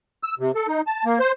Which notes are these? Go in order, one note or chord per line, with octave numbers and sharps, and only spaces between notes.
E6
C3
A4
D#4
A5
A#3
C5